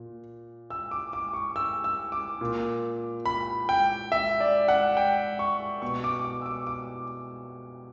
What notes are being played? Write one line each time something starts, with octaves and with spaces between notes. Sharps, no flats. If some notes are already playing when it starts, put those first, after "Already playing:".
Already playing: A#2
E6
D6
D6
C#6
E6
E6
D6
A#2
B5
G5
E5
D5
F#5
G5
C#6
B2 C#6
D6
D6
E6
D6
D6